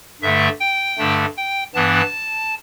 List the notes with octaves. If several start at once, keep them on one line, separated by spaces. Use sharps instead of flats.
G2 D3 A3 E5
G5
G2 D3 A3 D4
G5
G2 E3 B3 D4 A5